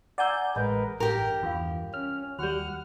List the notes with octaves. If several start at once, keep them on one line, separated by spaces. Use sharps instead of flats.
D5 F#5 G#5 A#5 E6 G6
A1 G#3 A#4 B4 C#5 D#5
A1 G2 G4 A#4
E2 F4 F5
C#4 F6
D#2 G3 F#4 C#5 F#5 F6